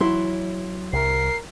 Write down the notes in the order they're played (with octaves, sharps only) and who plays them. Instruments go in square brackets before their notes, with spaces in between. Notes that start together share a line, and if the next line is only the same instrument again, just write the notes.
[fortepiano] E3 E4 C6 [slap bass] F#3
[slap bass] C2 [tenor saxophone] A#4 [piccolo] C7